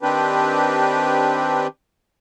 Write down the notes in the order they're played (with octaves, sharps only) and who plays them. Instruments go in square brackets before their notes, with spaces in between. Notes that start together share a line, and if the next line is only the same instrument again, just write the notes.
[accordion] D#3 C4 D4 G4 B4